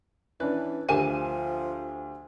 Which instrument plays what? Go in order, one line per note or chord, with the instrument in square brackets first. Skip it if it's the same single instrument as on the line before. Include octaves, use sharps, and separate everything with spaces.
[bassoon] E3 [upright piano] C#4 D4 [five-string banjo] B4
[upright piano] D2 G4 D#7 [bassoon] F3 [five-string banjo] A#4 G#5 A5